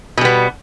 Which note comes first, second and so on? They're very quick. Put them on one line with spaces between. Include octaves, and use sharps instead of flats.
B2 G3 B3